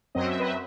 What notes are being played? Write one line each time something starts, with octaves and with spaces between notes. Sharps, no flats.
F#2 F#3 C4 D#5
E5
B4 D#5
E5